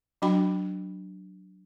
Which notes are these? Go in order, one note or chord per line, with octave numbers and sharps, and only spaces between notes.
F#3 D4 F#4 G5 B5